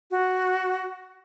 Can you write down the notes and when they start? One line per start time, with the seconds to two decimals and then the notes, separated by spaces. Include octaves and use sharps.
0.11 F#4